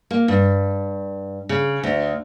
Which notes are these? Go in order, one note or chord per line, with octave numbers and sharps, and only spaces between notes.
A#3
G2
C#3
D2